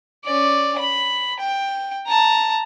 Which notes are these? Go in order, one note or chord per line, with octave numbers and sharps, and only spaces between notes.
C#4 D5
B5
G5
A5 A#5